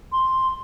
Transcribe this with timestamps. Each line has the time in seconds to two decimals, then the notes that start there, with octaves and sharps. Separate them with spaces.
0.12 C6